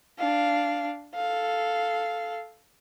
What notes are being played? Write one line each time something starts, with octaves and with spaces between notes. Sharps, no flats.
D4 F5
A4 F5